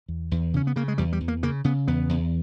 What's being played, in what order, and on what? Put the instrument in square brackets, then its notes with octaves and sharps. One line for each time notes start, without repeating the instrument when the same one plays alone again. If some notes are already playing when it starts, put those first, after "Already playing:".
[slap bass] E2
E2
C#3 C#4
B3
C#3 A#3
G#3
E2 G3
G3
E2
A#3
C#3 A#3
C#3 B3
E2 B3
E2